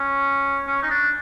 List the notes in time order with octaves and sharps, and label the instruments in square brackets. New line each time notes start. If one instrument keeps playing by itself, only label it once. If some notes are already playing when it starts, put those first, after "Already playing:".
Already playing: [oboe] C#4
C#4
D#4
D4